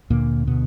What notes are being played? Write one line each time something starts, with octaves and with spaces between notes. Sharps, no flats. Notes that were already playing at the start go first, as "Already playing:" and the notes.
D2 A#2 D3 A#3
B2 B3